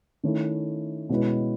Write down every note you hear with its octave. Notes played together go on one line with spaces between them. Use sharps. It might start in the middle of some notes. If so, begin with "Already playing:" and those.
D#3 A3 C#4 E4
B2 G#3 C#4 E4 B4